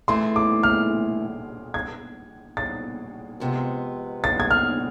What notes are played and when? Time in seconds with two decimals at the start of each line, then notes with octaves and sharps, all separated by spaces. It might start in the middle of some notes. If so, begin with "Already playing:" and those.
0.08 E3 A3 E4 G#4 C6
0.36 D6
0.63 F6
1.74 G#6
2.57 A6
3.40 F2 C3 G#3 B3
4.24 A6
4.40 G#6
4.51 F6